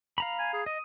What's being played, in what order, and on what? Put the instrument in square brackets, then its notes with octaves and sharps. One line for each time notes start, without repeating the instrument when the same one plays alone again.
[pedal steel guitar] F5 A#5 B5
[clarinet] G#5
G#4
[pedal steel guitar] D#5 [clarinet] D#6